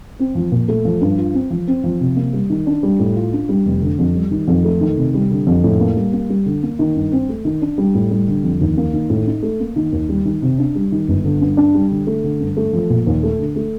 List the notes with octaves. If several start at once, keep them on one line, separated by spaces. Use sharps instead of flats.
C4
F3
A#2
A3
F3
G2
F4
C4
F3
C4
F3
C3
A#3
G3
D#3
D4
G3
A2
F4
D4
G3
F1
D3
F2
G3
D#3
F2
A3
D#3
C3
G3
D3
F2
A2
A#3
G3
A#3
G3
D3
A#3
D#3
G2
C4
A3
D#3
D4
G3
A2
G3
D3
F2
D#2
A#3
D#3
A2
D#4
A3
A#3
D#3
D#2
G3
D#3
C3
D4
G3
D#3
G1
D3
G2
D4
G3
D3
A3
D3
G2
A3
F3
A#2
D#2
A3
D3
A3